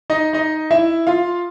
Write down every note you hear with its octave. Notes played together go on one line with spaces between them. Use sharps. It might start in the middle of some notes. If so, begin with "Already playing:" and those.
D#4 D#5
D#4 D#5
E4 E5
F4 F5